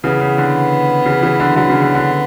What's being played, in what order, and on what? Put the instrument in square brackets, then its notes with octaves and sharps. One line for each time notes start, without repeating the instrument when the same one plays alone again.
[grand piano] C#3 E3 [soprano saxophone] B3
[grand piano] C#3
D3
C#3 E3
C#3 E3
D3
[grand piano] D3 F#3 [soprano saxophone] B3
[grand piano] C#3 E3
D3
D3